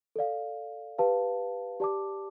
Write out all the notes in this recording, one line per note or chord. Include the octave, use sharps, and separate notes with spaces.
A4 D5 F5
G4 B4 F5 A5
G4 D5 A5 D6